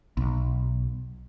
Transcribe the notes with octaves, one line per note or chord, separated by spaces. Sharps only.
B1